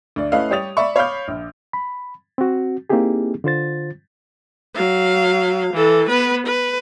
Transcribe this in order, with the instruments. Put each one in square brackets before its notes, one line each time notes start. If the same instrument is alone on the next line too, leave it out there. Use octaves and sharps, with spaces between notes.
[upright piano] D2 D5
A3 C#4 E4 B4 D#5 F5
G3 G4 C#5 D#6 A6 F7
D5 E5 B5 C#6
C#5 F5 B5 D6 F6 G6
A#1
[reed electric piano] B5
C4 F#4
A#3 C4 D#4 E4 G4 G#4
D3 F4 C5 A6
[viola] F#3 F5
E3 A4
B3 B4
B4